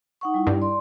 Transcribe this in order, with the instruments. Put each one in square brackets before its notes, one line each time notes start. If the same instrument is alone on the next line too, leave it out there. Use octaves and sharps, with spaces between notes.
[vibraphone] D#4 F#5 C#6
G3 E4
[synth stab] G2
[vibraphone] D5 C6